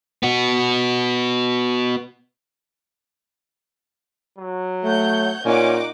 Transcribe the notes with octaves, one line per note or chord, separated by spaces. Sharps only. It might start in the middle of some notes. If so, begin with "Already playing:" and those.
B3 F#4
F#3
A3 C#5 F#5 G6
A#2 C#4 D#4 F#5 D6